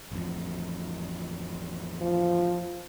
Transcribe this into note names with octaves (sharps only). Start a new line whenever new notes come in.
A1 F2
F3